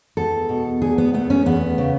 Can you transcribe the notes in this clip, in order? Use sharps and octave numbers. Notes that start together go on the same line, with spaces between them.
E2 A4
B2
E2 G#4
B3
A3 B3
C#4
E2 B3
C#3